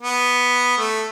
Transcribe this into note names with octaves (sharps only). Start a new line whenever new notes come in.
B3
A3